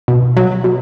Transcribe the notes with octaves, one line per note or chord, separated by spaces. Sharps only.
B2
F#3
B2